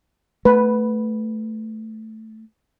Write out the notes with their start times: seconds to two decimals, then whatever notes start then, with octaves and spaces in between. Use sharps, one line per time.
0.45 A3 B4